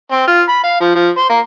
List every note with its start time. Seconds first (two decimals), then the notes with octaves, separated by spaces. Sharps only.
0.12 C4
0.27 F4
0.49 B5
0.64 F5
0.81 F3
0.95 F3
1.18 C5
1.30 A#3